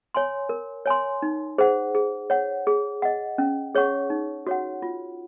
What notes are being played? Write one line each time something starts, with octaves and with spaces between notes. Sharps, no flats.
C#5 G#5 C6
A#4
C#5 G#5 C6
D#4
G#4 C5 F#5
G#4
C#5 F#5
G#4
D#5 F#5
C#4
G#4 C#5 F#5 C#6
D#4
F#4 C#5 F#5
F4